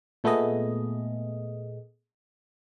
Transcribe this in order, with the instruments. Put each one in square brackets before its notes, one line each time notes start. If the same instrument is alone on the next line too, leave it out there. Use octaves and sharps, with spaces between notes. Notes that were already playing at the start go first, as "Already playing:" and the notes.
[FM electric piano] A#2 A3 B3 G#4 D#5